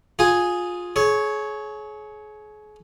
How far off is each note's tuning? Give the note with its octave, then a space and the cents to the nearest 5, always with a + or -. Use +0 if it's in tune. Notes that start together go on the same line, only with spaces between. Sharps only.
F4 +20 G#4 +0 G#5 +0
G#4 +35 C#5 +0